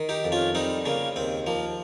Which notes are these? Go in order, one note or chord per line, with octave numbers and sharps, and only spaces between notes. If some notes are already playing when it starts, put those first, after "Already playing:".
Already playing: D#3
D#4 G4
F2
C#4 F4
G3 C4 D#4
C#3 A#3 C#4
D#2 C4
F3 A#3